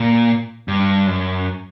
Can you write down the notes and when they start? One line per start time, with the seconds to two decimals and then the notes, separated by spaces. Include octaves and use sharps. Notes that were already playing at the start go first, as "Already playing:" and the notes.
Already playing: A#2
0.68 G2
1.07 F#2